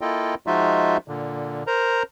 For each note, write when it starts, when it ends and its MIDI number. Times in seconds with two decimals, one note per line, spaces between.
0.01 0.35 58
0.01 0.35 64
0.01 0.35 65
0.01 0.35 69
0.01 0.35 75
0.01 0.35 79
0.47 0.97 53
0.47 0.97 56
0.47 0.97 63
0.47 0.97 65
0.47 0.97 66
0.47 0.97 76
1.08 1.63 46
1.08 1.63 50
1.67 2.03 70
1.67 2.03 72
1.67 2.03 82